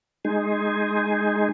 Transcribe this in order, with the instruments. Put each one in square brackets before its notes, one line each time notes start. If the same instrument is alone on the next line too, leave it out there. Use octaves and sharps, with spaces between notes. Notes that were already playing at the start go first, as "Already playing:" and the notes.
[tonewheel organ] G#3 D#4 G#4